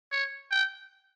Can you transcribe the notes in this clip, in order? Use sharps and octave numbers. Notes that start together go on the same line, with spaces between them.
C#5
G5